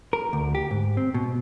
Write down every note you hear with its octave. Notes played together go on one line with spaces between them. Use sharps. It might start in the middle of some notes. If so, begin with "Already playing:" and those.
A#4
D2
G4
G#2
C4
B2